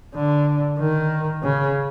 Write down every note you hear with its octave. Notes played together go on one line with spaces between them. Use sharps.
D3
D#3
C#3